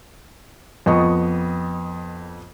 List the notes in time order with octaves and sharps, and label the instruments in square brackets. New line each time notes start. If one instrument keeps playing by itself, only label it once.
[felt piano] F2 B3 D#5 C#6